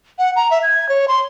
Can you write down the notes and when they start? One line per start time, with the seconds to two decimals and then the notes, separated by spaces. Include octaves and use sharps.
0.19 F#5
0.36 A#5
0.51 E5
0.63 G#6
0.89 C#5
1.08 C6